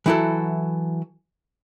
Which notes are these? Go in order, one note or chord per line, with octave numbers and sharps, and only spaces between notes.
E3 F#3 E4 F#4 A4